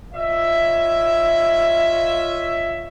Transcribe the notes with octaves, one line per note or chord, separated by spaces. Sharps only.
F4 C#5 D#5 E5